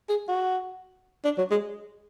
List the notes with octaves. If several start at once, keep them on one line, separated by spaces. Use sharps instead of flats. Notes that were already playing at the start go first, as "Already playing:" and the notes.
G#4
F#4
D4
F#3
G#3